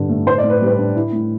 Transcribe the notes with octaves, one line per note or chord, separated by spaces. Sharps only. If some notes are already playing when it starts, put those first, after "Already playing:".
Already playing: G2 D3 D4
A3
A2 C5
D5
A2
B4
G3 B4
D4
E4
A2